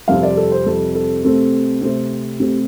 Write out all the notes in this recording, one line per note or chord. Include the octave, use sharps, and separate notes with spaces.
F2 C3 G3 C4 F5
D5
A4
C5
F2 C3 G3 C4 A4
A4
C3 A3 C4 A4
C3 A3 C4 C5
C3 A3 C4 G4